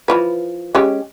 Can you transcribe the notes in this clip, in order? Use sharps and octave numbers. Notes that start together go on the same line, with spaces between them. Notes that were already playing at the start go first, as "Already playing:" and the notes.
E3 F3 B4
G#3 C#4 G4